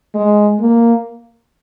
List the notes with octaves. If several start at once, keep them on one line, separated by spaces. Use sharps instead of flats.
G#3
A#3